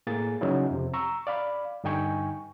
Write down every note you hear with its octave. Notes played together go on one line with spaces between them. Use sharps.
A2 A#3 G#4 A6
C#3 F#3 C#4 D#4 E4
F2 C3
A#5 C#6 E6
D5 F5 B5
G2 D3 D#4 G5 G#5 C#6